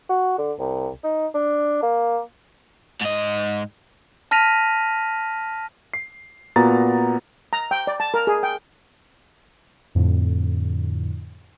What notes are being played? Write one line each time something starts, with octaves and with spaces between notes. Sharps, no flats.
F#4
D3
C2
D#4
D4
A#3
G#2 D#5
A5 F6 A#6 B6 D#7 F7
C7
A#2 B3 F#4 A#5 A6
A#5
G5
D5
A5
A#4
G#4
G5
F2 A2 D3